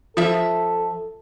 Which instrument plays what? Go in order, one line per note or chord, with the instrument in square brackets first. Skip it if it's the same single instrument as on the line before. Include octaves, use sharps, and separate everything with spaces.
[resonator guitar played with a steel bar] F3 E5 [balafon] F4 [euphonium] A4